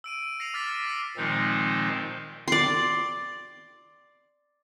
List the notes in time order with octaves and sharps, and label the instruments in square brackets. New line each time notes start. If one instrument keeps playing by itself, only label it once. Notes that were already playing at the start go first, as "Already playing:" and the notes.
[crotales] E6 D7 D#7
D#7
E6 A#6 C7 C#7 D#7 F7
D6 F6 A6 B6
E6 A6 D#7
E6 A#6 C7 C#7
[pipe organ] A#2 D#3 F3 G#3 C4 D#4
[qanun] D5 C6